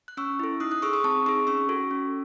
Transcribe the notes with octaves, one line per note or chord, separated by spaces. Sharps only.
F#6
C#4 C#6 E6
E4 A4
D#4 D#6 F#6
D#6 F#6
G#4 C#6 E6
C6 D#6
C4 A5 C#6
D#4 G#4 C#6 E6
C#4 C#6 E6
F#4 A4
C#4